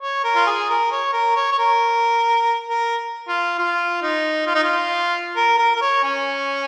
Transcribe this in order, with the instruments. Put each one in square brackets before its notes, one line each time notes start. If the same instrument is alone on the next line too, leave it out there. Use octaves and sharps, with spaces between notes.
[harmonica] C#5
A#4
F4
G#4
A#4
C#5
A#4
C#5
C#5
A#4
A#4
F4
F4
D#4
F4
D#4
F4
A#4
A#4
A#4
C#5
C#4